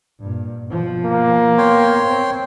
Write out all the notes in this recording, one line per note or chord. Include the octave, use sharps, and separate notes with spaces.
G2 A#2
B2 F3
A#3
B3 C#5 G5 C6
C4